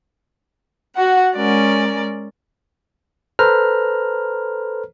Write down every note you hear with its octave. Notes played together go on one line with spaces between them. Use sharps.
F#4 F#5
G#3 C#4 A#4 D5
A4 B4 C5 A#5 F6